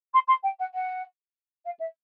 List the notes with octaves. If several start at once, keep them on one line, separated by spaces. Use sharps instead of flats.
C6
C6
G5
F#5
F#5
F5
E5